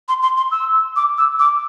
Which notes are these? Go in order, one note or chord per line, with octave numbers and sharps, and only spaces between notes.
C6
C6
C6
E6
D6
E6
D6